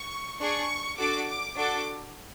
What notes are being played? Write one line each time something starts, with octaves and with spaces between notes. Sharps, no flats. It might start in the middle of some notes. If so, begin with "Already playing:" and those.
Already playing: C#6
D4 G#4 C#6
D4 F#4 A4 D6
D6
D4 F#4 A4 D6